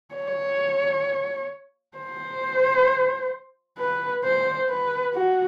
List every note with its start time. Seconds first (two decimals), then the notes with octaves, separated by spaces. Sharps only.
0.15 C#5
1.97 C5
3.79 B4
4.24 C5
4.69 B4
5.15 F#4